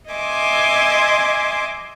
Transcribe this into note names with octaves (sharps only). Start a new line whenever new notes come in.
D#5 E5 G#5 C6 D6